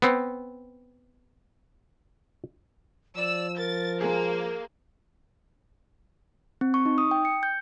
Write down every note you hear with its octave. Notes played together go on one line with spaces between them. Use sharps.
B3 C4
F3 D5 E6
A#4 A6
G#3 A#3 G#4
C4
C#6
D#4
D#6
G5
C#7
G6